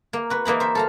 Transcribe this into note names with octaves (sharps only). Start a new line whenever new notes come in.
A#3
F#4 B4
E3 A#3 D#4 B5
C5 E5
A4 F5 A#5